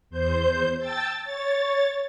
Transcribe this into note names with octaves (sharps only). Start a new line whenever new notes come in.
E2 C5 G6
G5 A5 E6 A6
C#5 A6